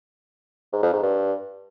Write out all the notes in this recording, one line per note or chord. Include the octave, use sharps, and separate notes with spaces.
G#2
F2
G#2
G2